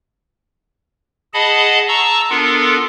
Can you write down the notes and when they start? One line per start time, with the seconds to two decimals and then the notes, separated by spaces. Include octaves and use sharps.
1.34 G#4 D#5 F#5 A5 B5
1.88 A5 A#5 C#6 E6
2.30 B3 D4 F4 A4 A#4